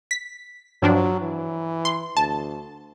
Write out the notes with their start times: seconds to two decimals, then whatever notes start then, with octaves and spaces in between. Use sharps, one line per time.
0.11 B6
0.82 G2 F3 F#3 D4
1.21 E3
1.85 C6
2.17 D2 A5